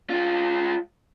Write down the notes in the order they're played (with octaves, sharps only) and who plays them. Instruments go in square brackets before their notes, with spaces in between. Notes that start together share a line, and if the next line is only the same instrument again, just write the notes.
[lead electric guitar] G#3 F4